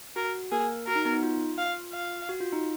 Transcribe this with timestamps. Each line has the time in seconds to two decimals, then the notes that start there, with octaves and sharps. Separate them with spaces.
0.16 F#4 A#4
0.51 A#3 G#4 A#4
0.87 F#4 A#4
0.95 D#4
1.05 B3
1.13 D#4
1.23 F4
1.58 F5
1.93 F5
2.29 F#4
2.40 F4
2.52 D#4